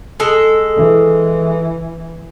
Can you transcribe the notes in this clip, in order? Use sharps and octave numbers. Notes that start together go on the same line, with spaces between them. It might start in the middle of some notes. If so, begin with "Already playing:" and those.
G#3 A4
E3